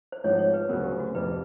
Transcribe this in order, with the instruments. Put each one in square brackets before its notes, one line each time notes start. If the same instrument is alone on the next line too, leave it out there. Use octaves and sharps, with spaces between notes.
[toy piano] C5
[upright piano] G#1 G#2 F3 [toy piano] C#5
[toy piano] C#5
B4
[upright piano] D2 C#3 F#3 B3 [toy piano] A#4
[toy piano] G4
F#4
[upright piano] F2 C3 F3 [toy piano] B4